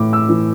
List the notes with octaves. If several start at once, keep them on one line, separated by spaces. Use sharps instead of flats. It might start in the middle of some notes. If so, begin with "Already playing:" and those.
Already playing: A2 E3 D6
E6
E3